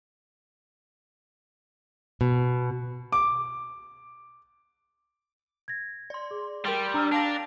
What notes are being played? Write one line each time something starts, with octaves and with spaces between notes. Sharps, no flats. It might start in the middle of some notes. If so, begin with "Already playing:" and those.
B2
D6
G#6 A#6
D5 C6
G#4 D6
G3 A#4 G5 C6
D4 A#5 E6 F6
D4 F5 G5 A5 A#6 D7 F7